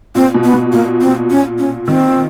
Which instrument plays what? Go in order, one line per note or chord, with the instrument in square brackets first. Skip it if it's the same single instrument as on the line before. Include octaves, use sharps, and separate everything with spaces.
[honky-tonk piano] A#2 [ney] C4
[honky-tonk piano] B2
[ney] B3
[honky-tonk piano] B2
[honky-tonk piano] A#2 [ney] A#3
[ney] C4
C#4
C#4
[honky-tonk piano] D#3 [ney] C4